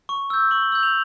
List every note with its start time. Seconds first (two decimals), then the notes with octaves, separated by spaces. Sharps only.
0.09 C#6
0.30 E6 G6
0.51 C#6 F#7
0.62 G7
0.72 E6 F#7
0.75 G6
0.83 F7